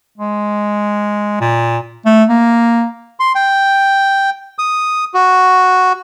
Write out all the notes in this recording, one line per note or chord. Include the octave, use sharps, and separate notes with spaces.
G#3
A#2
A3
A#3
C6
G5
D#6
F#4